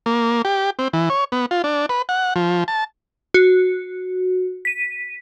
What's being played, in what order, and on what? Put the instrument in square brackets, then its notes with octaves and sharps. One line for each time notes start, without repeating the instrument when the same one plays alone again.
[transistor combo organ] A#3
G4
C4
E3
C#5
B3
F4
D4
B4
F#5
F3
A5
[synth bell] F#4
B6 D#7